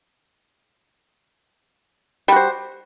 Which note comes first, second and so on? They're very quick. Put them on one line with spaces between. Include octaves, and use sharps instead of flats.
G3 F#4 C5